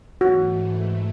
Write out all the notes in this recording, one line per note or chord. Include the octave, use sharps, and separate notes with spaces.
G#2 E3 A3 F#4